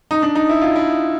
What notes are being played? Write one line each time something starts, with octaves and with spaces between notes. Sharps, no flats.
D#4
D4
D#4
E4
F4
E4